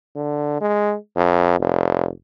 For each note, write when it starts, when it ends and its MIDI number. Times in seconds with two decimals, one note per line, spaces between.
0.16 0.58 50
0.61 0.95 56
1.16 1.56 41
1.60 2.09 29